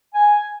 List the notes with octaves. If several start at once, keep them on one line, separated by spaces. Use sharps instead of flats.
G#5